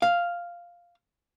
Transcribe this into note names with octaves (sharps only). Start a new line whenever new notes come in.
F5